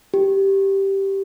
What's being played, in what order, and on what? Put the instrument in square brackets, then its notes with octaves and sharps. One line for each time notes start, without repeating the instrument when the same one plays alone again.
[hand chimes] G4